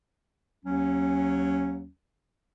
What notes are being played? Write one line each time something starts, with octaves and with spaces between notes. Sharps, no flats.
D#2 F#3 C#4